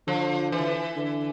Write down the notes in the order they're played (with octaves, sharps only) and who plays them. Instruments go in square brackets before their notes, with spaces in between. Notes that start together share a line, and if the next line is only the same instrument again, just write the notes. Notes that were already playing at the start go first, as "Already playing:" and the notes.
[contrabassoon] D3 [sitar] F3
[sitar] E3
[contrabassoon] D3